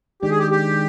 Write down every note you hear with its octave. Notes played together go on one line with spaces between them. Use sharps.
D#3 G#3 D4 G4
G#4
G4
G4